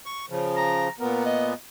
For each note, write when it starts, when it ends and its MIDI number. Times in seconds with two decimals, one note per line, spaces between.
0.06 0.26 85
0.30 0.88 49
0.30 0.88 53
0.57 0.91 82
1.00 1.54 46
1.00 1.54 59
1.00 1.23 70
1.25 1.52 75